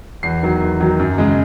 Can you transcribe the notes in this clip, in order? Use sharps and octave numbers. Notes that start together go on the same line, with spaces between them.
E2 C7
D#3 F#3
E2
D#3 F#3
F#2
C#3 G#3